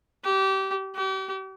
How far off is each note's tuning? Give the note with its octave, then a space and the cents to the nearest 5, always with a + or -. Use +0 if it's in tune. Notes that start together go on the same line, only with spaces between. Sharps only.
G4 -25
G4 -40